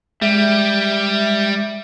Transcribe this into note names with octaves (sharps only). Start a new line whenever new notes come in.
G3 G#3 E5